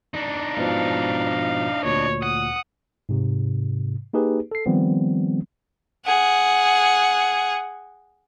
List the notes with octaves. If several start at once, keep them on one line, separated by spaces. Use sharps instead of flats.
D4 D#4
G#2 B2 F3 F5
D2 A#2 C#5
F#5 D#6
G#2 C3
A#3 D#4 G4 G#4 B4
A4 C7
D#3 F3 G3 B3 C4
G#4 F#5